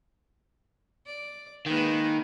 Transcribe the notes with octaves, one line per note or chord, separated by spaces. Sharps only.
D5
D#3 G#3 A#3 B4